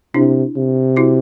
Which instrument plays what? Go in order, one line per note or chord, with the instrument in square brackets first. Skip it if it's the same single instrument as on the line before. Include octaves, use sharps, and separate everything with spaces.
[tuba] C3 [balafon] D4 E4
[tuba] C3
[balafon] E4 F#4